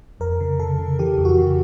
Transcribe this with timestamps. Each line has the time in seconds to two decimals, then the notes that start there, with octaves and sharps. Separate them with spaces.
0.20 F2 A#4
0.40 C#3
0.59 C#3 A4
0.79 C#3
0.99 E3 G4
1.18 F2
1.25 F#4
1.38 C#3